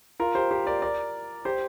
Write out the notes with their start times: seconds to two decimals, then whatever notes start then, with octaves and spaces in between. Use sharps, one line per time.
0.20 F4 A#4
0.35 G4 C5
0.51 G4 C5
0.66 A#4 D5
0.82 A#4 D5
1.45 G4 C5